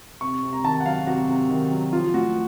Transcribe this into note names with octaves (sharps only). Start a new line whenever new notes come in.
C3 C#6
C3
A#5
D#3 A5
F#5
F#3 F5
C3 F#4
C3
D#3
F#3
F3 F4
A2 F#4